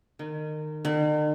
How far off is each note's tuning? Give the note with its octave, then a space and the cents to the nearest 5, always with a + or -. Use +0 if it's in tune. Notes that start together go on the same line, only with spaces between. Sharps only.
D#3 -25
D#3 -45